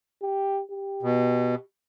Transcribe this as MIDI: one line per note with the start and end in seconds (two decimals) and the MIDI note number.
0.22 0.62 67
0.72 1.62 67
1.03 1.55 47